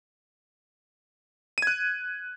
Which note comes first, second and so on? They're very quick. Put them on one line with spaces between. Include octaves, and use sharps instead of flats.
D#7 G#6 F#6